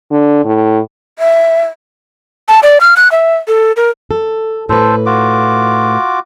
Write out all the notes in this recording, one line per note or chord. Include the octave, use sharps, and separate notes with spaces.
D3
A2
E5
A5
D5
F6
F#6
E5
A4
A#4
A4
A2 A4 B4 C5
F4 F#4 D6